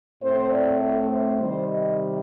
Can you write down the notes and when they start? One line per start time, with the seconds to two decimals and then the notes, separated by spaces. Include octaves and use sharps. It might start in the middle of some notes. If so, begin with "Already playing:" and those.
0.22 A2 A3 C4 C5
0.52 D5
0.82 A4
1.11 C5
1.40 C3 D#3 G3 C5
1.69 D#5